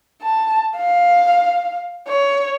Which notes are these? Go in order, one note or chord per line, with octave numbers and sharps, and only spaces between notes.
A5
F5
C#5